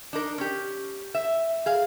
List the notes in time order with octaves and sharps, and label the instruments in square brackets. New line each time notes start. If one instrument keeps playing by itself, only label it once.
[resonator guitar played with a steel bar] D4 D#4 A#4
C#4 G4
E5
G#4 F5